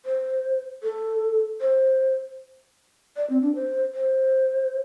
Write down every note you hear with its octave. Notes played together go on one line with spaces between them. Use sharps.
C5
A4
C5
D5
C4
D4
C5
C5